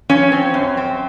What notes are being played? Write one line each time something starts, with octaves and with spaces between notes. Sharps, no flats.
F3 C#4 C#5
C4
F#2
C4